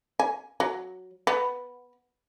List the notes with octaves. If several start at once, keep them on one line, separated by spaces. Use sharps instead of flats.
G#5
F#3
B3